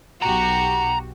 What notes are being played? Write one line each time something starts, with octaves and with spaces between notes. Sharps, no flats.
B1 F#4 G4 A#5